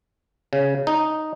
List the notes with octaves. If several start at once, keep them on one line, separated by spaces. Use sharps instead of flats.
C#3
D#4